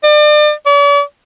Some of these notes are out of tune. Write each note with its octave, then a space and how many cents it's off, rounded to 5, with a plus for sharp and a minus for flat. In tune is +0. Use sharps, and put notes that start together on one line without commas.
D5 +35
D5 -45